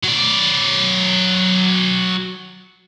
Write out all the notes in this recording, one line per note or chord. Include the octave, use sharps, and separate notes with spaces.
F#3 D5